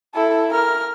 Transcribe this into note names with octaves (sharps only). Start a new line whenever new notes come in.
E4 A4
A#4 F6